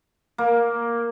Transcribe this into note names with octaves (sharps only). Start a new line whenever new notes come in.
A#3